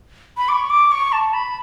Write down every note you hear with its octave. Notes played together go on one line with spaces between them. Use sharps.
B5
D6
C#6
D6
C#6
A5
B5